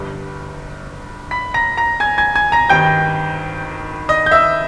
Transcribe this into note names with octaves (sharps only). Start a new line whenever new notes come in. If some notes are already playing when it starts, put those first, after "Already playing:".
Already playing: G1 G2 G3
B5 B6
A#5 A#6
A#5 A#6
G#5 G#6
G#5 G#6
G#5 G#6
A#5 A#6
G#1 G2 D#3 G3 G5 G6
D#5 D#6
G6
E5 E6